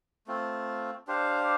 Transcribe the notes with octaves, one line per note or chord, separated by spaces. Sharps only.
A3 C4 F4
D4 G4 C5 F5